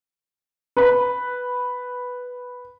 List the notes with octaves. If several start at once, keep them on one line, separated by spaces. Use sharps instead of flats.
B4 B5